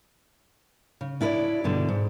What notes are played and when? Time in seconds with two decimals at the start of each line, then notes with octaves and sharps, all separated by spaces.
1.01 C#3
1.21 D4 E4 A#4 B4 C#5 D5
1.64 G2 B2 D3
1.88 G#2